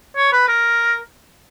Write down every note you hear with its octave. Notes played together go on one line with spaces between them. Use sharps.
C#5
B4
A#4